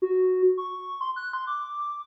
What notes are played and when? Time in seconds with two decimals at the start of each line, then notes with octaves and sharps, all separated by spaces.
0.02 F#4
0.58 C#6
1.01 C6
1.16 F#6
1.33 C6
1.47 D6